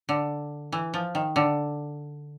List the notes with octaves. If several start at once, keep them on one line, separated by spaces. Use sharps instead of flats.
D3
E3
F3
D#3
D3